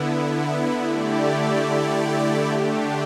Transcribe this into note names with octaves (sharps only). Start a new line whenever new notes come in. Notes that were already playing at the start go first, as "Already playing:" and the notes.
Already playing: D3 B3 E4
D3 A3 E4 G4 D5
D3 A3 D4 G4